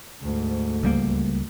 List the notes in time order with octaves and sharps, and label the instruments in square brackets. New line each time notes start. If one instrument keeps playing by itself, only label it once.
[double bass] D2 G#2
[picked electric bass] C#2 G3 A#3